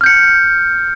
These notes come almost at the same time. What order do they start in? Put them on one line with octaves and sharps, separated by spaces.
F6 G6 C#7